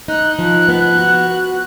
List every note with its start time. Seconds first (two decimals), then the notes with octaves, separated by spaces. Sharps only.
0.08 D#4 F#6
0.39 F3
0.69 B3
0.98 F#4